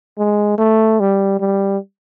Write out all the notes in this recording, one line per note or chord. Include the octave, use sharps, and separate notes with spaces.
G#3
A3
G3
G3